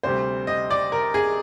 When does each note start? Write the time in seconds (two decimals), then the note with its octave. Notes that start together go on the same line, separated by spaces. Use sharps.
0.03 D2 C3 G3 C5
0.47 D#5
0.70 D5
0.92 A#4
1.14 G#4